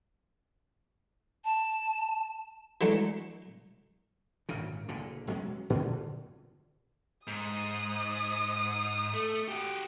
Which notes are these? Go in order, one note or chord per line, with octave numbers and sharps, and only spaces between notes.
A5
E3 F#3 G#3 A3 D4
G#1 F#2 A#2 C#3
F#1 A#2 D3
E1 F#3 G#3 C#4
A#2 D3
G#2 D#6
A3
F#4 G4